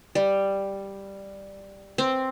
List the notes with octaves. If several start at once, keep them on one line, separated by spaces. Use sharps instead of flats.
G3
C4